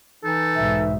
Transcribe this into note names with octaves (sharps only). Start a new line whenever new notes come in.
E3 D#4 A4
B1 G#2 E5